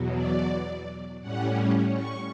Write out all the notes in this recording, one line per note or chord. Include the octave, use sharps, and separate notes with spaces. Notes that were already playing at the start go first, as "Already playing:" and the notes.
Already playing: E2 B2 F#3
D5
A2 G3 C#4 F#5
C#6